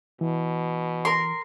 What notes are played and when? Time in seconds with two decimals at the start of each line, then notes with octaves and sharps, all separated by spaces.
0.21 B2 E3
1.05 A#4 C6